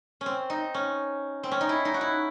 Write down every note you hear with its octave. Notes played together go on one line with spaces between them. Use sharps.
C#4
C4
D#4
C#4
C4
C#4
D#4
E4
D#4
F#4
E4